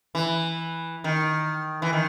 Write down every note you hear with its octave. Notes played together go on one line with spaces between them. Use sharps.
E3
D#3
E3
D#3